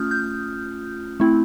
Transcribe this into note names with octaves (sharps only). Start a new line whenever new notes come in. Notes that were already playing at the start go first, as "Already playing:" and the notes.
Already playing: A3 C#4 F4 D#6 F6 G6
G6
A3 C4 E4